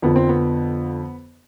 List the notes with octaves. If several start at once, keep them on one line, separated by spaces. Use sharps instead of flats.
F2 D3 F3 B3
C4
B3